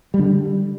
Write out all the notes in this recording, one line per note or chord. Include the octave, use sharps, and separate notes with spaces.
G3
D3
G3